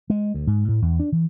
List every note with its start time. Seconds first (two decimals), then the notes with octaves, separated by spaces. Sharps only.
0.10 G#3
0.34 D2
0.47 G#2
0.68 A2
0.82 E2
0.99 D4
1.12 E3